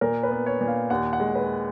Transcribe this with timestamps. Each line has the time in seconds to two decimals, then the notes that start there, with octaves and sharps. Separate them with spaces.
0.01 A#2 A#4
0.23 B4
0.31 B3
0.46 C#5
0.61 A#2
0.68 F5
0.90 D#2 F#5
1.13 F#5
1.20 G#3
1.35 B4